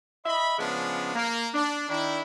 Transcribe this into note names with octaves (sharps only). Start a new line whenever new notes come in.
D#5 E5 B5
C#3 F3 G#3 B3 C#4 D4
A#3
D4
D#3 D4 E4